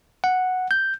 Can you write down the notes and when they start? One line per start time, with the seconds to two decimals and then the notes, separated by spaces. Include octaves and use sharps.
0.24 F#5
0.71 G6